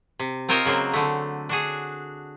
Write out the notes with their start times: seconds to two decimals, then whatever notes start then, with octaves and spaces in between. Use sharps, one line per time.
0.19 C3
0.49 C4 F4 A#4 C5 C#5 D#5
0.65 C#3 F#3 A#3 C4
0.93 D3 A3
1.49 D4 F#4 G#4